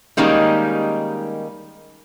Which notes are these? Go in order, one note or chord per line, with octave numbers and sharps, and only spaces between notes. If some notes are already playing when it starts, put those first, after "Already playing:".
D#3 G3 G#3 A#3 C#4 D#4